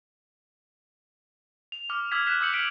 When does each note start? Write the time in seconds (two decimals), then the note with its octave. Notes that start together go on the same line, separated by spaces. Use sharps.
1.72 F7
1.90 D6 F6
2.11 D6 E6 F6 G#6 B6
2.26 F6 F#6 B6 E7
2.41 D6 E6 G6 C#7 F#7
2.53 F6 B6 D7 F7